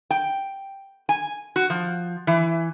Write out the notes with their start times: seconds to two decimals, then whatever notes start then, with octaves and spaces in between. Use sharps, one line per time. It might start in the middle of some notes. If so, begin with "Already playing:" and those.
0.11 G5
1.09 G#5
1.56 F#4
1.70 F3
2.27 E3